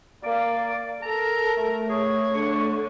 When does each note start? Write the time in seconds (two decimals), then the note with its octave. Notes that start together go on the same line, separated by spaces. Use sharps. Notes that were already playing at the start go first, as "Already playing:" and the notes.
0.23 A#3 D5 F5
1.02 A4 A#4 A#5
1.57 A3
1.89 G#4 C#5
2.34 D3 C#6